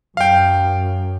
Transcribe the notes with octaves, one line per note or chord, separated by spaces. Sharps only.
F#2 F5 G5